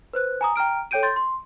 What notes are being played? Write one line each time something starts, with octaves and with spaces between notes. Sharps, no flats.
B4 C5 F#6
G#5 A#5 D#6
G5 A#5 F6 D7
A4 C#5 G5 G6 D7 D#7
C6 G6 A6
C6